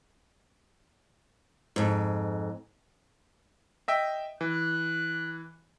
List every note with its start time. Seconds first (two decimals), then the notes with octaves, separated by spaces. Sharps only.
1.76 F2 G#2
3.88 D#5 E5 G5
4.41 E3 F#6